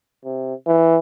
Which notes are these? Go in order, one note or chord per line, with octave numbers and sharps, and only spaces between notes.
C3
E3